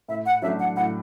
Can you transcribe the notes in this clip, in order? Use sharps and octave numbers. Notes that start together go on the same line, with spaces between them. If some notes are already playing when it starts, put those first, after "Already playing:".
A2 E5
F#5
F#3 A3 D4 A4 E5
F#5
A2 F#5